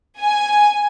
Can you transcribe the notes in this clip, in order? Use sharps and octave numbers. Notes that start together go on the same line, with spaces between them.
G#5